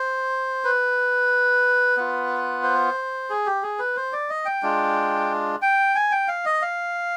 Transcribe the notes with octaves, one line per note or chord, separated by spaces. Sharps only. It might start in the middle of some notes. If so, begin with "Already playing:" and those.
Already playing: C5
B4
B3 F4
C5
G#4
G4
G#4
B4
C5
D5
D#5
G5
G#3 D4 F4
G5
G#5
G5
F5
D#5
F5